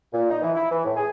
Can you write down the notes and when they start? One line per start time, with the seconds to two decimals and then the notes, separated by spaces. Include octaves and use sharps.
0.13 A#2
0.30 D#4
0.42 E3
0.55 E4
0.71 E3
0.85 A2
0.97 G#4